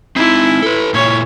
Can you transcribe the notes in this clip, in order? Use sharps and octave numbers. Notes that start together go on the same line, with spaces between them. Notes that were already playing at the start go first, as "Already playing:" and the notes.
C4 D#4 E4
A4 B4
A#2 A#3 E4 C#5